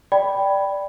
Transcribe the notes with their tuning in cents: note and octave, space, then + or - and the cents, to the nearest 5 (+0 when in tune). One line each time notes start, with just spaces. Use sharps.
D5 +0 G5 +0 B5 +0